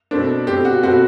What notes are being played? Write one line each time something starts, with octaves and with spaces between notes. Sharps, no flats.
B2 A3 C4 D4
B2 A3 C4 G4
F#4
B2 A3 C4 F#4